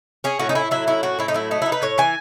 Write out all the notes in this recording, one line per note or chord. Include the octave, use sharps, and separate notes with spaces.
C#4 G#4
A2 F#4
D#4
A2 E4
F#3 E4
C#4 E4
A2 F#4
A2 E4
D#4
F#3 E4
A3 D#4
D#4 E4
B4
A2 C#5
E3 G#5